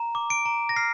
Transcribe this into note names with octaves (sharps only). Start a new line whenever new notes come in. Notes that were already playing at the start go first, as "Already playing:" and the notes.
Already playing: A#5
D6
D7
A#5
A#6
F6 C7